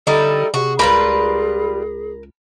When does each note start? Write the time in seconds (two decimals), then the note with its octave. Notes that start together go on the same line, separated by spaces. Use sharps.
0.07 D3 G3 D#4 E4 A4
0.54 C3 F#4 G#4
0.79 C#2 G3 F4 A#4 B4 B5